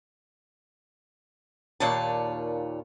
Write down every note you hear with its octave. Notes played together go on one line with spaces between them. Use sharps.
D#2 A#2 D#3 C#5 D5 A5